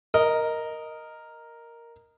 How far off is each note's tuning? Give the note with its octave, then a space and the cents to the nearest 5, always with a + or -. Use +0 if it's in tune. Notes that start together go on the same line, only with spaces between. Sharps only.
A#4 +0 D#5 +0